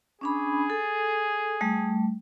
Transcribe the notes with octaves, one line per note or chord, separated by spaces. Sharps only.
C#4 D4 G#4 B5
A4
G3 A3